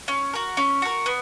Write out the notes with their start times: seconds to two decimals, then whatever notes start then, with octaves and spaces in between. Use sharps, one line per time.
0.08 C#4
0.34 F#4 A#4
0.57 C#4
0.82 F#4 A#4
1.06 B3